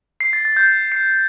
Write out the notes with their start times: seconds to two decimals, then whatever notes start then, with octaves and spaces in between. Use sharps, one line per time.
0.20 C7
0.33 A6
0.45 A6
0.56 G6
0.92 C7